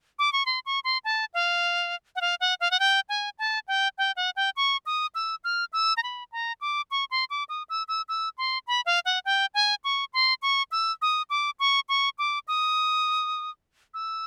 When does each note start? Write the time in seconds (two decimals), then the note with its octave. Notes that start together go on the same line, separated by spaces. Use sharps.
0.19 D6
0.33 C#6
0.46 C6
0.66 C#6
0.84 C6
1.05 A5
1.34 F5
2.16 F#5
2.21 F5
2.41 F#5
2.61 F5
2.71 F#5
2.80 G5
3.09 G#5
3.39 A5
3.68 G5
3.98 G5
4.16 F#5
4.36 G5
4.57 C#6
4.86 D#6
5.15 E6
5.44 F6
5.73 E6
5.97 A#5
6.03 B5
6.32 A#5
6.61 D6
6.91 C#6
7.11 C6
7.30 D6
7.49 D#6
7.70 E6
7.88 E6
8.09 E6
8.38 C6
8.67 B5
8.86 F5
9.05 F#5
9.25 G5
9.54 G#5
9.84 C#6
10.14 C6
10.42 C#6
10.72 E6
11.02 D#6
11.30 D6
11.60 C#6
11.89 C#6
12.18 D6
12.48 D#6
13.94 E6